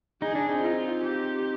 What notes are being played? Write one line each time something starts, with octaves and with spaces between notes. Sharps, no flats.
D#4 G#4
D4
C4 D#4
F4
G4